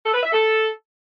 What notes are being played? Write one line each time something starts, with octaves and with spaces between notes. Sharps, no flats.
A4
B4
E5
A4